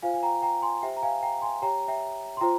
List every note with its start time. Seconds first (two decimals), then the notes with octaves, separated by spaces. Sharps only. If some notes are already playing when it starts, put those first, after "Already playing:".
0.02 F4 C5 F5 G#5
0.14 G#5
0.23 G5 A#5
0.42 G5 A#5
0.62 G#5 C6
0.83 G4 C5 E5 G5
0.97 A#5
1.03 F5 G#5
1.22 G5 A#5
1.42 G#5 C6
1.62 G4 C#5 G5 A#5
1.88 E5 G5
2.37 C6
2.41 F4 C5 G5 A#5